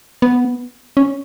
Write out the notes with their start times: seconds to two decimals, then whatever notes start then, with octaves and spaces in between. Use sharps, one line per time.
0.22 B3
0.97 C#4